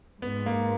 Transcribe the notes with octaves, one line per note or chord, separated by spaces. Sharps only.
G#2 B3
A#3